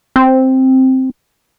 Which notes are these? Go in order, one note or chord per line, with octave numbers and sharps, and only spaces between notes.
C4